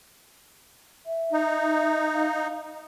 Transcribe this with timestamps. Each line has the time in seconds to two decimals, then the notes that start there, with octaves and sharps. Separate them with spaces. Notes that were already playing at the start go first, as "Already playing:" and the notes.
1.06 E5
1.32 D#4
2.13 F5